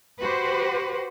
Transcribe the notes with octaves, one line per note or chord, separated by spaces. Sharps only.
F#4 G4 B4 C5